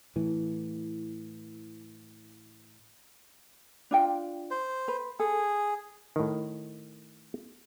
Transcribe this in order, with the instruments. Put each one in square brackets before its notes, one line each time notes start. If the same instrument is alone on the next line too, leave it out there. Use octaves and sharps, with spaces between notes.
[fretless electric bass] A2 E3
[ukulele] D4 F4 G5
[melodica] C5
[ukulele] B4
[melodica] G#4 [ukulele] A4
[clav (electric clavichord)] A2 D#3